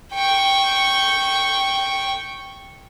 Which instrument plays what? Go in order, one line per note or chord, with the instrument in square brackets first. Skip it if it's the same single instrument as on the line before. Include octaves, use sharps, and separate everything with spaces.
[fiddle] G5 C#6